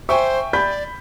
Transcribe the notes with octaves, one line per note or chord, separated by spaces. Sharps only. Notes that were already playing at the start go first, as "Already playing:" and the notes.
C5 E5 G5 G#5 C#6
D5 B5 G6 B6